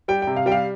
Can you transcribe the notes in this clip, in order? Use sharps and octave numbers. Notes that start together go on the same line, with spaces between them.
G3 G5
G5
C3
F5
G3 G5
F5